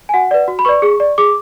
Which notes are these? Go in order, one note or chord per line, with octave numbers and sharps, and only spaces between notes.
G#5
F#4 F#5
B4 D5
F#4
B5
B4 D5 C#6
G#4
D5
G#4 D6